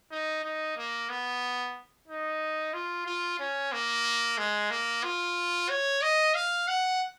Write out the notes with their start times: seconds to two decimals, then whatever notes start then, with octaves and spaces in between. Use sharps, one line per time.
0.11 D#4
0.44 D#4
0.77 A#3
1.10 B3
2.08 D#4
2.74 F4
3.06 F4
3.39 C#4
3.73 A#3
4.38 G#3
4.71 A#3
5.04 F4
5.69 C#5
6.02 D#5
6.35 F5
6.68 F#5